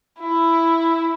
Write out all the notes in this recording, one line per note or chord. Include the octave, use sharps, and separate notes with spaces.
E4